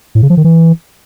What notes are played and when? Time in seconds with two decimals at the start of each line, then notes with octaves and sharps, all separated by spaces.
0.15 A2
0.22 C#3
0.30 F3
0.37 D#3
0.44 E3